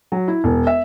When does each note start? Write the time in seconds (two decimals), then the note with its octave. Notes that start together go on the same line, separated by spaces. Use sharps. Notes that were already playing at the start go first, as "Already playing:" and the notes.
0.12 F#3
0.28 E4
0.44 E1
0.67 E5